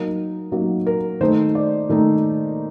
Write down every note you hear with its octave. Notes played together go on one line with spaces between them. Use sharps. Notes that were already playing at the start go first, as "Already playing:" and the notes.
Already playing: F#3 A#3 D#4 A#4
F#3 A#3 D#4
A#4
D#3 A3 D#4 C5
D5
D#3 A3 D#4